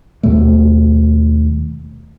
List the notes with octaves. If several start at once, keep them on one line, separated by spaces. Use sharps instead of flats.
D#2 B2 G3 A3